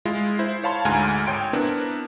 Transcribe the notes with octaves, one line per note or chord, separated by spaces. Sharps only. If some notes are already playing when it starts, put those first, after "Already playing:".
G#3 E4 F4
E4 C5
C#5 F5 A5 B5 C6
D2 G#2 G#3 G#5 A#5 F6
G#1 C#5 G5 C6 D7
B3 C4 D4 E4 A#4 B4